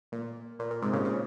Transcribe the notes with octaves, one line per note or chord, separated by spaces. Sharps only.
A#2
A#2
A#2
G#2 C3
A#2 C#3
A#2 C#3